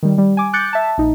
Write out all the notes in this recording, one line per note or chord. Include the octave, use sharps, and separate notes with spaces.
D#3 G3
G3
G#5 D6
D6 F#6 G6 A6 C#7
E5 A5
A#1 D#4